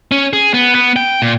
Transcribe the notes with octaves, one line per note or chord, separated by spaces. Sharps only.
C#4
G#4
B3
B3
G5
A#2